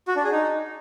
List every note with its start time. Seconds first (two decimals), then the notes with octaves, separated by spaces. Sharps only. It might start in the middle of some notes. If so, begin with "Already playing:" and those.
0.08 F#4
0.16 D4
0.24 G#4
0.32 D#4